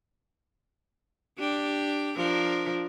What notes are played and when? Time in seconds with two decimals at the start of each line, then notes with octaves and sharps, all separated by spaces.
1.38 D4 G4
2.16 F3 D4 A#4